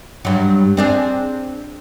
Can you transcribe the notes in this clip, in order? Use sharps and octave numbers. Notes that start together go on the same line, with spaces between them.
G2 F#3
C4 D4 G#4